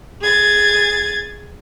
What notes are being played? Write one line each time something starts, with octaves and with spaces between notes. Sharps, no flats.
G#4 G#6 A6